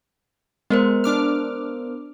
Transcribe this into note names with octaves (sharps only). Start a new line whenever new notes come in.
G#3 B3 A#4 C5
D4 D6 F6